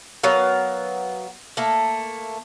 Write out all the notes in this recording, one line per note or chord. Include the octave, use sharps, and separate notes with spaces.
F#3 B3 A#4 F5
A3 A#3